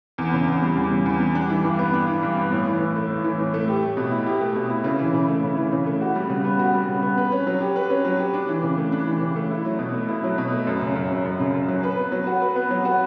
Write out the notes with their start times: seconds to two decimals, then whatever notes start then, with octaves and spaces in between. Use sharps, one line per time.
0.18 E2
0.33 C#3
0.48 E2
0.62 G3
0.77 E2
0.91 C#3
1.06 E2
1.20 G3
1.35 D4
1.50 E3
1.64 G2
1.79 B3
1.94 D4
2.08 E3
2.23 G2
2.37 B3
2.52 A2
2.66 E3
2.81 A2
2.96 A3
3.10 A2
3.24 E3
3.39 A2
3.54 A3
3.68 G4
3.82 A3
3.97 B2
4.11 E4
4.26 G4
4.41 A3
4.56 B2
4.70 E4
4.84 C#3
4.99 E3
5.14 C#3
5.28 A3
5.43 C#3
5.58 E3
5.72 C#3
5.86 A3
6.01 F#4
6.16 G3
6.30 C#3
6.45 B3
6.59 F#4
6.74 G3
6.88 C#3
7.03 B3
7.17 B4
7.32 C#4
7.47 F#3
7.61 G4
7.76 B4
7.90 C#4
8.05 F#3
8.19 G4
8.34 D4
8.49 E3
8.63 C#3
8.77 A3
8.92 D4
9.07 E3
9.22 C#3
9.36 A3
9.50 E4
9.65 F#3
9.79 B2
9.94 A3
10.08 E4
10.24 F#3
10.38 B2
10.52 A3
10.67 F#2
10.81 C#3
10.95 F#2
11.11 F#3
11.25 F#2
11.40 C#3
11.54 F#2
11.68 F#3
11.83 B4
11.98 B3
12.12 F#3
12.27 F#4
12.42 B4
12.56 B3
12.71 F#3
12.85 F#4